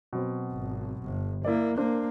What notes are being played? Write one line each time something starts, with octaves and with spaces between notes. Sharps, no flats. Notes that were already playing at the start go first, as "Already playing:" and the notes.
B2 F#3 C4
G#1
G1
A#3 E4 A#4 D5
A#3 D4 A#4 C5